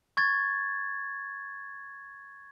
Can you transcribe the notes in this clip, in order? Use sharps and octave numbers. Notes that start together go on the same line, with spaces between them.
C#6 G#6 A6